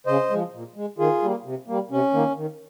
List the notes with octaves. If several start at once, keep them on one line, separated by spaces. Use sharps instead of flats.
C#3 C5 D#5
F3 G#3
A#2
G#3
D#3 F4 G#4
G3 A#3
C3
G3 A#3
C3 C#4
D#3 A#3
D#3